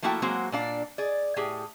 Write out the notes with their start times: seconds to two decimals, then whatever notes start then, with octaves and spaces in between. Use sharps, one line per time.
0.02 F3 A3 A#3 E4 F#4 G5
0.22 F#3 G#3 A#3 C4 F#4
0.52 A#2 D4 F5
0.98 G#4 D5
1.36 A2 G4 G#4